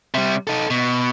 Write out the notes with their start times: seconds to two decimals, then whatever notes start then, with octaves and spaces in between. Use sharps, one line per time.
0.14 C3 G3
0.47 D#4 A4
0.70 B2